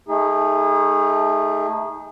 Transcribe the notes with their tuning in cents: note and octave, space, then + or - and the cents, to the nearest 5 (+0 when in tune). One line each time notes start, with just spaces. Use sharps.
A3 +0 D#4 +20 G#4 -25